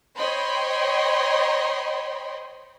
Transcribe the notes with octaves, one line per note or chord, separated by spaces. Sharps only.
C5 C#5 D#5 G5 B5 C6